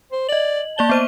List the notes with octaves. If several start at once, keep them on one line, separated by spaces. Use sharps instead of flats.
C5
D5 D#5 F#7
A#3 D5 A5 G7
B3 C5 D#7